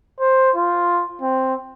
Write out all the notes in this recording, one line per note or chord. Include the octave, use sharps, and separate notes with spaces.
C5
F4
C4